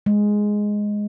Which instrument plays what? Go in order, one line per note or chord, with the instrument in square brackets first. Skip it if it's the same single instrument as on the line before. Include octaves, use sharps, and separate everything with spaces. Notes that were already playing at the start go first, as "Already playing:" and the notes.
[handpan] G#3